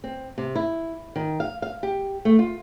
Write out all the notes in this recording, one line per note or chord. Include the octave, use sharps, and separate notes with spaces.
C4
C3
E4
D#3
F5
F5
G4
A3
F4